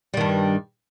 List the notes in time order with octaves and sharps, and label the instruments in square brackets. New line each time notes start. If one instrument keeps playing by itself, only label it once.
[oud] G3
D#3
G2